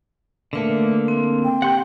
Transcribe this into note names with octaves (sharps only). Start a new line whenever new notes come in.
D3 A3 A#3 B4 E5
C4
G5
G4 F#5 C6 G6